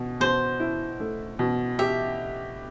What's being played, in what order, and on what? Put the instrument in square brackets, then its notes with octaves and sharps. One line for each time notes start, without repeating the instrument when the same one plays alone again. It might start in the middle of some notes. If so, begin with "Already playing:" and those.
Already playing: [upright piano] B2
[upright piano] B2 [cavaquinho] C5
[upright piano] E4
A3
B2
[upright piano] G4 [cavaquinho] E5